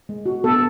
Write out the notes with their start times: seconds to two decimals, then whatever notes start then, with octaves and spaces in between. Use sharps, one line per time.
0.09 G#3
0.26 F#4
0.44 B3 A4